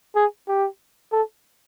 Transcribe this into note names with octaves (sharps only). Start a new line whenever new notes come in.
G#4
G4
A4